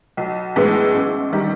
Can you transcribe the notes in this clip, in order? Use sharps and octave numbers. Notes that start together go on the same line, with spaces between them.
B1
A2 E3 G#3 B3
A1
D#3 G3